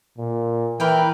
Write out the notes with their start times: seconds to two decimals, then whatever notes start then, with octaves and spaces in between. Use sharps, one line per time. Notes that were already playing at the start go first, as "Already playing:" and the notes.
0.18 A#2
0.80 E3 A#4 B4 G5